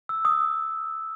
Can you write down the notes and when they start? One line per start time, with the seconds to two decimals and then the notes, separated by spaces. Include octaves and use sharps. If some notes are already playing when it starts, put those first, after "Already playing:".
0.09 E6
0.25 D#6